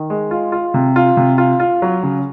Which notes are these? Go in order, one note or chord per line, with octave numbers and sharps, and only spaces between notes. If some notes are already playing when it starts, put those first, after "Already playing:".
Already playing: D#3
G#3
F4
F4
C3
F4
C3
F4
F4
F#3
C#3